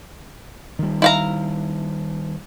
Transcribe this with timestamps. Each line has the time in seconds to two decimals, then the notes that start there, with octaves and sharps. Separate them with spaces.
0.79 D#3 G3
1.02 E4 F5 A#5